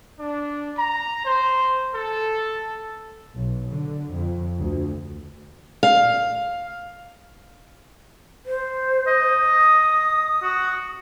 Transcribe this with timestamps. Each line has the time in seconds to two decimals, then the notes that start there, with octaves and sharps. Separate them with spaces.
0.19 D4
0.76 A#5
1.24 C5
1.94 A4
3.37 B1
3.70 D3
4.13 F2
4.58 D2
5.83 F5
8.46 C5
9.07 D#5
9.59 D#6
10.42 F#4